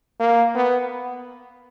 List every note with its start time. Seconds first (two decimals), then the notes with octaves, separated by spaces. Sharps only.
0.20 A#3
0.55 B3